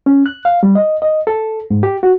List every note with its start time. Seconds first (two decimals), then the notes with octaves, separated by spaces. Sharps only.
0.06 C#4
0.26 F#6
0.45 F5
0.63 G3
0.75 D#5
1.02 D#5
1.27 A4
1.71 G#2
1.83 G4
2.03 F#4